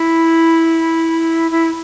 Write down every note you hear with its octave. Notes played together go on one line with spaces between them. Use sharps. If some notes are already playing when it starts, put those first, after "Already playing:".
Already playing: E4
E4